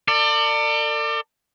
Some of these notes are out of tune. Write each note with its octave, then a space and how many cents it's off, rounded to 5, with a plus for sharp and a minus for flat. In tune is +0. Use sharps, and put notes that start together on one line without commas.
A4 +45 D5 +20